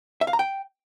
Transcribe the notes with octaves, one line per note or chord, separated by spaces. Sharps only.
E5
F5
A#5
G5